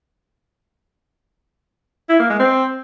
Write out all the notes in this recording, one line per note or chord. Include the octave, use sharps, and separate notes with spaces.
E4
A#3
G#3
C4